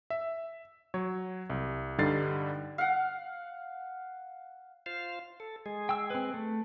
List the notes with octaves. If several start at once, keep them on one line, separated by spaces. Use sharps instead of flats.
E5
F#3 C#5
C2
G2 D3 G3 D#4 A6 C7
F5 F#5
F4 C5 F5
A4
G#3 G#4
G5 E6
C4 B4
A3